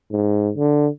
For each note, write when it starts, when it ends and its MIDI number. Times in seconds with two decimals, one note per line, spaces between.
0.11 0.51 44
0.57 0.88 50